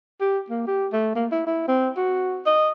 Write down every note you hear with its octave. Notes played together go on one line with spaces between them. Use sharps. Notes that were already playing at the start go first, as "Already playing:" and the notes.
G4
A#3
G4
A3
A#3
E4
E4
C4
F#4
D#5